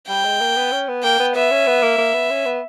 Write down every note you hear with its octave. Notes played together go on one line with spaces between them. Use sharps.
G3 G5
G#3
A#3
B3
C#4
B3
A#3 G5
B3
B3 E5
C#4
B3
A#3
A#3
B3
C#4
B3